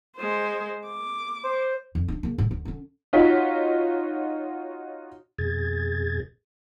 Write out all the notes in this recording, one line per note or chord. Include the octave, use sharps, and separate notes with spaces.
G#3 C5
D6
C5
F2
D4 D#4
C#3 A#3
A2 G3
D2
D3 C#4
D#4 F4 F#4 C#5 B6
F2 B2 G#4 G#6 A6